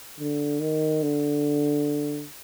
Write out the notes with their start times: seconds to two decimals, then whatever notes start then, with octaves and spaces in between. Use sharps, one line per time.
0.20 D3
0.61 D#3
1.03 D3